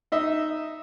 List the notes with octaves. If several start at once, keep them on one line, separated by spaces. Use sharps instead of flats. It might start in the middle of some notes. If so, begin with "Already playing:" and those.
D#4 D#5 E5